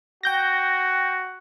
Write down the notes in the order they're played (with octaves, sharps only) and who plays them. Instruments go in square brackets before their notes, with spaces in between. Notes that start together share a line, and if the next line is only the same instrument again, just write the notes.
[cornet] F#4 [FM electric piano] G5 G6 A#6